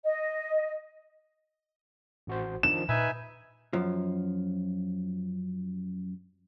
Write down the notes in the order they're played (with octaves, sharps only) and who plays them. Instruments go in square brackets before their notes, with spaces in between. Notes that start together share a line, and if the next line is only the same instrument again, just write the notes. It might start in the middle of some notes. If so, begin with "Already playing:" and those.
[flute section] D#5
[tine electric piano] A1 F#4 C5
[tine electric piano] D#3 F3 D#4 [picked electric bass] D4 [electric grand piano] E7
[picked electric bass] A#2 [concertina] D#4 E5 G#5 [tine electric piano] B4
[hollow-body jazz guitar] F#2 F3